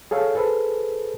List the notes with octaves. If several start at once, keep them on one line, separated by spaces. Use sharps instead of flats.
G#4 A4 C#5 F5
G#4 A4 B4 C5